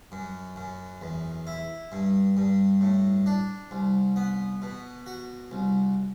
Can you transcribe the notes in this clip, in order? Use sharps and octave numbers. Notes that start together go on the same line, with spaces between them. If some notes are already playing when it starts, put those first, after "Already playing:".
F#2
F#2
E2
E4
G2
G2
A2
D4
C2
B3
B2
F#4
C2